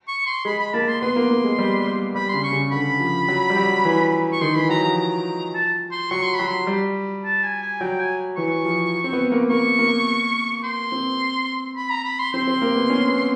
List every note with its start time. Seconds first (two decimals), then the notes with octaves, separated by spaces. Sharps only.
0.08 C#6
0.27 C6
0.45 G#3 B5
0.60 B5
0.74 A#3 A5
0.88 C6
1.01 B3 C6
1.16 A#3
1.30 A#3
1.44 G#3
1.59 G3
1.87 G3
2.15 G3 B5
2.29 C#3 C6
2.44 C#6
2.53 C#3
2.71 D3 B5
3.00 F3
3.28 F#3
3.50 G3
3.57 F#3
3.85 E3
4.33 C#6
4.41 D#3 C6
4.56 E3 B5
4.69 F#3 A#5
4.84 F3 A#5
4.98 A#5
5.55 A5
5.92 C6
6.11 F#3 C#6
6.23 C6
6.35 F#3 B5
6.48 C6
6.67 G3
7.25 A5
7.43 G#5
7.62 G#5
7.81 F#3 G5
8.00 G#5
8.37 E3 C#6
8.65 F3
9.04 C4
9.13 B3
9.32 A#3
9.50 A#3 C#6
9.79 A#3
10.64 C6
10.92 C4
11.76 B5
11.91 A#5
12.04 B5
12.19 C6
12.33 C4 C6
12.48 C4
12.62 A#3
12.76 B3
12.90 C#4
13.09 B3